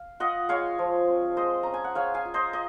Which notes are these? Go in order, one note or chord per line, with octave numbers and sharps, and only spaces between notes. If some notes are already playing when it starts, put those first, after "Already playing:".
Already playing: F5
F4 D#5 F#5
G#3 C#5 F5
F3
C4
G#3 C5 D#5
C#4 A#5
G#5
F#5
G#3 C#5 F5
F5 G#5
F4
C5 D#5
D#5